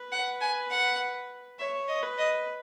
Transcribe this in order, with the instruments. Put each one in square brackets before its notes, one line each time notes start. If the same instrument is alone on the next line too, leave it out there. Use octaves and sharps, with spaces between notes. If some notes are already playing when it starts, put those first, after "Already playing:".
Already playing: [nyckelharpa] B4
[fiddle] F#5
G#5
F#5
[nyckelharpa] C#5 [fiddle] E5
[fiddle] D#5
[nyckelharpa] B4
[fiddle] D#5